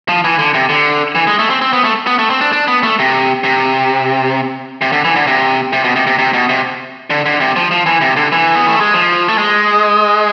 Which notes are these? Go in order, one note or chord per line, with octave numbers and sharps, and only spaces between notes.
F3
E3
D3
C3
D3
E3
G#3
A3
C4
C4
B3
A3
B3
A3
C4
D4
D4
B3
A3
C3
C3
C3
D3
E3
D3
C3
C3
B2
C3
C3
C3
B2
C3
D3
D3
C3
F3
F3
E3
C3
D3
E3
B3
A3
G#3
F3
A3
G#3